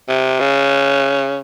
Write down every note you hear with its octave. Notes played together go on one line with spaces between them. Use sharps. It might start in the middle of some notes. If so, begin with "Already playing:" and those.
C3
C#3